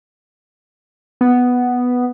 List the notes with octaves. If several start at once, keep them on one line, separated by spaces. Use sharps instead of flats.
B3